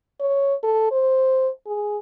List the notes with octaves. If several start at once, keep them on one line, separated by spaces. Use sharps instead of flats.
C#5
A4
C5
G#4